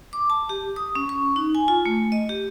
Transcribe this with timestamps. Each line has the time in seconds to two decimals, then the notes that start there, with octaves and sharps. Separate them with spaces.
0.13 D6
0.30 A5
0.49 G4
0.76 D#6
0.95 C#4
1.09 C#6
1.36 D#4
1.55 G#5
1.68 F4
1.86 A3
2.12 D#5
2.29 G4